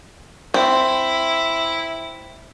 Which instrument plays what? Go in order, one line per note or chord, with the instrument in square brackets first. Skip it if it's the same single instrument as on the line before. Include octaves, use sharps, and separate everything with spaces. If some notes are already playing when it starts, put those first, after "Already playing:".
[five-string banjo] C4 [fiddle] E4